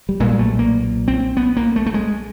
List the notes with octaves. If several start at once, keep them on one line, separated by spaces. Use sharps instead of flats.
G3
B1 A#2 G#3
A3
A#3
C4
B3
A#3
A3
A3
G#3